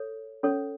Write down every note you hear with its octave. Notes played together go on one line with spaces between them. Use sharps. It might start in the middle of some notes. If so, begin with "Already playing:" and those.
Already playing: A4 C#5
C#4 A4 C#5